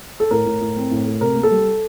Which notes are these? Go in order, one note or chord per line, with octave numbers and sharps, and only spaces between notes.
A4
A2 A#4
A2
A2
C4
A2
A3
C3 A#4
A#3
A4
G3